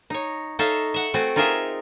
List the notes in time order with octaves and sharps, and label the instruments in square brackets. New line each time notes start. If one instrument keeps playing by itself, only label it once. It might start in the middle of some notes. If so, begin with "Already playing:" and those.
[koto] D#4 C#5
D#4 A4 C#5 E5 F5
E5 F#5
A3 C4 F#4 G#5
D#4 F4 G#4 A#4 E5